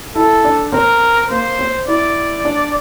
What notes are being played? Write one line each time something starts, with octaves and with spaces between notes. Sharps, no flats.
E4 A4
D4
C4 A#4
A#3 C5
C4
E4 D5
D4